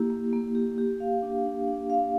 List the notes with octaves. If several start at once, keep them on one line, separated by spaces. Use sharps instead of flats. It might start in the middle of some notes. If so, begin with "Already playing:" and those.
Already playing: A#3 E4 G4
A#3
A#3
G4
G4
F5
D4
D4
D4
F5